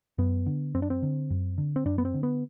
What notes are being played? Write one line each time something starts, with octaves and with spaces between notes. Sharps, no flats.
F#2 B3
D3
F#2 C4
D4
C4
D3
F#2
D3
C4
F#2 D4
B3
C4
D3
B3